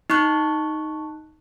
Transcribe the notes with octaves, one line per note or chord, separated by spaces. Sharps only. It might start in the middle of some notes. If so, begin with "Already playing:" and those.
D#4 C#6 F#6